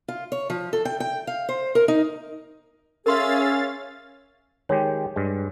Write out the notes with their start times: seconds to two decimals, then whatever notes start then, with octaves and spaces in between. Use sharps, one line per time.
0.08 F4
0.32 C#5
0.50 F3
0.73 A4
0.85 G5
1.00 G5
1.27 F5
1.49 C5
1.75 A#4
1.88 D#4
3.06 C#4 G#4 A#4 E5 F5 C6 E6 A6
4.69 D#3 G#3 G4 C#5
5.16 G2 G#3